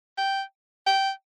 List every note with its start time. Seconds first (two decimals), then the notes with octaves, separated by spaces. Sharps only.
0.18 G5
0.86 G5